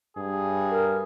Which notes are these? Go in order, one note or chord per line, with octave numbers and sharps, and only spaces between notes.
G2 G#4
A#4